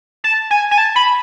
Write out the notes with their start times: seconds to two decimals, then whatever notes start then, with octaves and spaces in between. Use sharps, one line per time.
0.24 A5
0.50 G#5
0.71 G#5
0.78 A5
0.96 B5